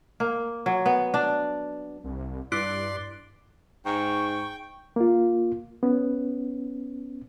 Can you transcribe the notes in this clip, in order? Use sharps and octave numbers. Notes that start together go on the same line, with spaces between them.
A#3
F#3
B3
D4
C2
G2 E4 D5 C6 F#6 D7
G#2 G5 C#6
A#3 F4
B3 C#4